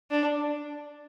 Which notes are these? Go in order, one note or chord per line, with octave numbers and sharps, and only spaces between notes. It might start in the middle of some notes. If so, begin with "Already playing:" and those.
D4